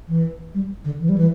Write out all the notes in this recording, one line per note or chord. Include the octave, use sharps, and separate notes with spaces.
E3
G3
D3
E3
G3
E3